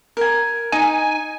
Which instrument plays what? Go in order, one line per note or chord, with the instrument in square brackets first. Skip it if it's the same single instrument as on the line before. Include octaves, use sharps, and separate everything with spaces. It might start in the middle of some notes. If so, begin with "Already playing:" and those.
[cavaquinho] A#4 G#5
[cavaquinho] D#4 [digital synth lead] G#5